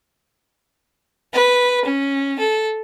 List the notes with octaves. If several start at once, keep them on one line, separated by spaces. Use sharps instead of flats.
B4
C#4
A4